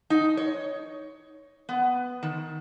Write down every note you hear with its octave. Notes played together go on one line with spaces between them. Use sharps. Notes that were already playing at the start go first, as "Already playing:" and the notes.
D#4
C#5
B3
D#3